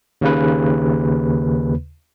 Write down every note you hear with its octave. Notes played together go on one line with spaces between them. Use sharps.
D#2 C#3 B4